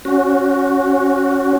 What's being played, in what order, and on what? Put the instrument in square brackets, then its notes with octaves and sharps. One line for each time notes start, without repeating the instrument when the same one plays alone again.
[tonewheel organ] C#4 F#4